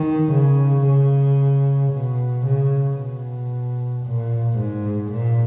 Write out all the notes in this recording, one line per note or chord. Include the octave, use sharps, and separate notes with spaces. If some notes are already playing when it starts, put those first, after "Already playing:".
Already playing: D#3
C#3
C#3
B2
C#3
B2
A#2
G#2
A#2